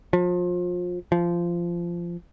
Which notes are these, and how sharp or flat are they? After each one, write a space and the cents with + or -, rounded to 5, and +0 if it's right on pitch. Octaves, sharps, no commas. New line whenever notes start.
F3 +30
F3 -15